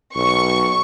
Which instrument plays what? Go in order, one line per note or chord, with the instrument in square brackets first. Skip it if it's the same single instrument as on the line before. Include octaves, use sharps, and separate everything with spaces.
[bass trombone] B1 [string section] C#6